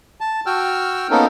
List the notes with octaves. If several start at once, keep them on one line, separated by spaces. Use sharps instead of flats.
A5
F#4 G5 E6 F6
A#3 B3 C#4 D#4 A4 A#4